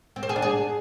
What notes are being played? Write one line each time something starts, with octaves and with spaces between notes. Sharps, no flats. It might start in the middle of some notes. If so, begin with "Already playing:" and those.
C4
C5
G#4
D4
G#4